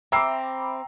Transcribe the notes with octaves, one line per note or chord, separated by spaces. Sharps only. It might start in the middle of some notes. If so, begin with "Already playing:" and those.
C4 E5 A#5 B5 D6 E6 C7